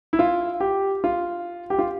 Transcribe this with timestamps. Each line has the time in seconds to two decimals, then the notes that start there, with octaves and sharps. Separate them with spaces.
0.13 E4
0.19 F4
0.60 G4
1.04 F4
1.70 G4
1.79 F4